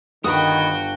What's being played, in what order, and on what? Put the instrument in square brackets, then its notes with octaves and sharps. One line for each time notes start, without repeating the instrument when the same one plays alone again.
[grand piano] G1 [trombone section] D#3 [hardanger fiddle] F#4 G5 [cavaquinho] B4 D#6